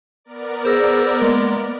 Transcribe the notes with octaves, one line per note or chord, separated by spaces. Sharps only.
B3 A#4 D5
G#4 C5 E6 A#6
G#3 A#3